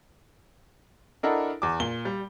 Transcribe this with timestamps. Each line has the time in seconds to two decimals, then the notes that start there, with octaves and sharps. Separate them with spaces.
1.23 D4 E4 A4 A#4 D#5 F#5
1.62 E2 D6
1.80 A#2 G7
2.05 G3